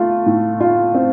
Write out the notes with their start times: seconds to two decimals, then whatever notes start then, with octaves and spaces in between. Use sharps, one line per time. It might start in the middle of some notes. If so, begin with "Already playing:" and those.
Already playing: A3 F4
0.26 A2
0.61 F4
0.94 C4